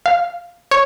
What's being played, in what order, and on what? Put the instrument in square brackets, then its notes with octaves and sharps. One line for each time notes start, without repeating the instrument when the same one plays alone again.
[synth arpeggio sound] F5
C#5